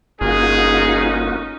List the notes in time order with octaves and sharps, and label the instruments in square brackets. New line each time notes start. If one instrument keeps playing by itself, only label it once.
[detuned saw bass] G1 [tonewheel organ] A#3 F4 F#4 [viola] C#4 D#4 [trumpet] G#4